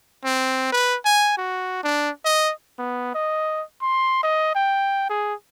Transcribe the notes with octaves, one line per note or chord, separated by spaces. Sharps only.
C4
B4
G#5
F#4
D4
D#5
B3
D#5
C6
D#5
G5
G#4